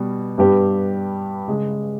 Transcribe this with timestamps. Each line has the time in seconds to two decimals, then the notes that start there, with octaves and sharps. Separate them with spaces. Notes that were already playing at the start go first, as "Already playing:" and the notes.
Already playing: B2 G3
0.38 G2 G3 B3 G4
1.48 C#3 G#3